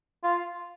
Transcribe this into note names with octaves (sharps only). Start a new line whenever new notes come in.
F4